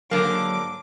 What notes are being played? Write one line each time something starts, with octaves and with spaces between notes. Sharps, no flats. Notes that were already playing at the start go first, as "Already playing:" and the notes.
G#2 D3 F#3 A#3 D6